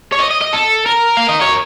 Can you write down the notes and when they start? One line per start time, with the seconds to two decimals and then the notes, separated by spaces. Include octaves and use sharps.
0.13 C#5
0.19 D#5
0.31 D#5
0.41 D#5
0.53 A4
0.86 A#4
1.17 F5
1.29 D#5
1.41 C#5